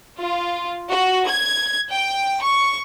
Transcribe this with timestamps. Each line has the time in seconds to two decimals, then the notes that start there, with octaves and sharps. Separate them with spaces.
0.18 F4
0.90 F#4
1.28 G#6
1.91 G5
2.42 C#6